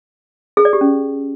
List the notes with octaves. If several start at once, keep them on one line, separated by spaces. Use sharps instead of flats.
G#4
D5
G4
C#4